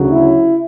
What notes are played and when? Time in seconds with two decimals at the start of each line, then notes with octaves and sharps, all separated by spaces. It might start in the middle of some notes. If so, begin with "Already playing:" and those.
Already playing: D2 C#3 F#3
0.10 E4